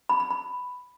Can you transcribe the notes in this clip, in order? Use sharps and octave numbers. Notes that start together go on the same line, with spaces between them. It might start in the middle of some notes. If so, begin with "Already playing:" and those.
B5
B5
B5